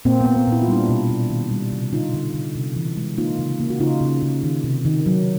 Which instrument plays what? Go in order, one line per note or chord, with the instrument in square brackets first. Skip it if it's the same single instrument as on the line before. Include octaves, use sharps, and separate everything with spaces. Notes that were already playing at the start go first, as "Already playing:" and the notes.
[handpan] A#2 A#3 C4
B3
A#3
B3
A#2
E4
F4
G3 D4 E4
B2
B2
D#3
G3
C3
D3 D#4 F4
D3
D3
C3
E3
G#3
A#3 D#4 F4
C#3
A#3
F#4
C#3 D#4 F4
C#3
C#3
D#3
C3
D#3
F#3